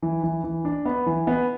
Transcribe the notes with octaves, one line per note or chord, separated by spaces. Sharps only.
E3
E3
E3
D4
B3
E3
B3